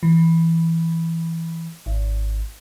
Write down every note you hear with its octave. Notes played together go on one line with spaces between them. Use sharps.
E3
G#1